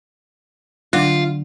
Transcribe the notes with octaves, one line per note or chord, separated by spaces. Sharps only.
D3 F#3 D4 F4